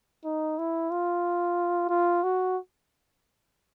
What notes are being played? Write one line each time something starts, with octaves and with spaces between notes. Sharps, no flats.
D#4
E4
F4
F4
F#4